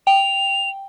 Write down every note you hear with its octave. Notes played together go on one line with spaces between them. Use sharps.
G5 F7